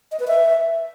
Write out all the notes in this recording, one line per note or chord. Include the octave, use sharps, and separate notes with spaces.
D#5
B4
E5